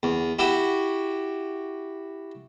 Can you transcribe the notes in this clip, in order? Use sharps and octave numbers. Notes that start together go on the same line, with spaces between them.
E2
E4 F#4 G4